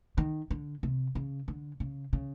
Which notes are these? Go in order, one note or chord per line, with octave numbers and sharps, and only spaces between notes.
D#3
D3
C3
C#3
D3
C#3
C#3